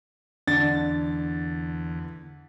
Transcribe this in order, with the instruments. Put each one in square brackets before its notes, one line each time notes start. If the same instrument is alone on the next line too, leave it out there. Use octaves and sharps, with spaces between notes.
[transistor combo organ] E2 [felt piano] D3 [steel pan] D4 [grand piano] A6